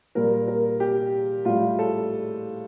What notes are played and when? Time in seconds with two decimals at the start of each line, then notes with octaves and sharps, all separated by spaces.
0.15 A#2 G3 A#4
0.48 A#4
0.80 G4
1.45 A2 G3 F4
1.79 A4